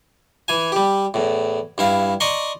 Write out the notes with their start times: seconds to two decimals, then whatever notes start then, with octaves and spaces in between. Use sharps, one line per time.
0.48 E3 G#5
0.72 G3 G4
1.14 E2 A2
1.78 G2 E4 F5
2.20 D5 D#5 A#5 C6 C#6